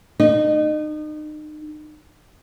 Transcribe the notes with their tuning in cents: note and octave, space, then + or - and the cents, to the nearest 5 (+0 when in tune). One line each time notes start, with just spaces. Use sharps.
D#4 -35